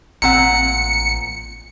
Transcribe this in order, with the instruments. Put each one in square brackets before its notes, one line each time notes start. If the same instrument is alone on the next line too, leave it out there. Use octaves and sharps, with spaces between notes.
[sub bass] A1 [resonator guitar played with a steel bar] A#2 C4 F#5 [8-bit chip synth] C#7